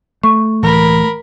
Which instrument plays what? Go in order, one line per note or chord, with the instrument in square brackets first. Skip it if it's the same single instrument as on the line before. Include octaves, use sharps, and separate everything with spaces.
[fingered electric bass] A3 [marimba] C#6
[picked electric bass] C#2 A2 E3 [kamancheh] A#4 B5